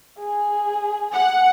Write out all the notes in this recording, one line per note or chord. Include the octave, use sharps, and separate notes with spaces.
G#4
F#5